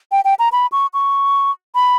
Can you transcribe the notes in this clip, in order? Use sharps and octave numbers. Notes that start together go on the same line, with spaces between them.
G5
G5
A#5
B5
C#6
C#6
B5